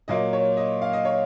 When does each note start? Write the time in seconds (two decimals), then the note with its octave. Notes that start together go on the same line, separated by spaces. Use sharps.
0.08 A#2 F#3 A#3 D#5
0.33 C#5
0.57 D#5
0.82 F5
0.93 D#5
1.05 C#5